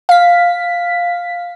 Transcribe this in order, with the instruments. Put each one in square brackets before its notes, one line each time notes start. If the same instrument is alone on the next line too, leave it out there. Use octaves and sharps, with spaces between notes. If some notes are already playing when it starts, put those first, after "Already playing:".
[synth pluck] F5 B6